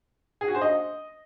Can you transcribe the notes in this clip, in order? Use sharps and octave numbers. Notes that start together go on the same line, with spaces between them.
G#4
F#4
C5
D#5